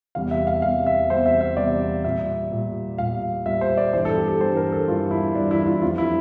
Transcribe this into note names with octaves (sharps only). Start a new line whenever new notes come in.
E2 C3 G3 F5
E5
F5
E2 C3 G3 F5
E5
E2 C3 G3 C5
E5
E5
E2 C3 G3 D5
A#2 G3 E5
A#2 G3
A#2 G3 F5
A#2 G3 E5
C5
D5
G2 E3 G3 C5
A4
G4
A4
G2 E3 G3 C5
A#4
A4
G2 E3 G3 F4
E4
G2 E3 G3 D4
E4
E4
F4
F2 E3 G3 F4
E4